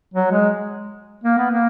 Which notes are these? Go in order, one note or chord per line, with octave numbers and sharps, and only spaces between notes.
F#3
G#3
A#3
B3
A#3